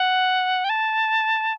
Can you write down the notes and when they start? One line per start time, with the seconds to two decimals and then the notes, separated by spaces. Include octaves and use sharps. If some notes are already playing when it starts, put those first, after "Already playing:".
Already playing: F#5
0.64 G5
0.69 A5